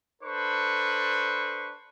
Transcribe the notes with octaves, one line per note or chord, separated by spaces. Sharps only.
D4 A4 B4 C5 C#6